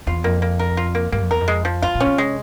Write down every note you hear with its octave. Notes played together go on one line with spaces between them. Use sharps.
E2 F4
F2 A#3
A#3
A#4
F4
A#3
G2 A#3
F2
E2 A#4
F2
G#3
F3
G2 F4
A#2
C#4
C3
G#3